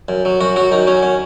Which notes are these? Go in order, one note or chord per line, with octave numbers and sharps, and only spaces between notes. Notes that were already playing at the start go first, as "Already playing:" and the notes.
F#2
F#3
F#2 F#4
F#3 F#4
F#2 D#4
F#3 C#4
C#4